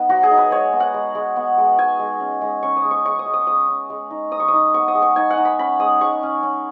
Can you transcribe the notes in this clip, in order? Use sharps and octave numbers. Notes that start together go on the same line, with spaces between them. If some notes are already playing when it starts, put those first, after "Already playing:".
Already playing: B3 D#4 B4
F#3 F#4
G#4
D#4
B4
G#3 C#5
B3
F#5
G#3
G#3
B3
G#3
G#3 G#5
G#3
C#4
G#3
C#4 C#6
D#6
G#3
C#6
G#3 C#6
D#6
G#3
D#6
G#3 D#6
C#4
G#3
D#4
D#4 D#6
C#6
D#6
D#4
B3 C#6
D#6
G#3
C#6
D#4 G#5
F#5
D#4
B5
C#4 B5
G#3 D#6
G#3 C#6
C#4
C#4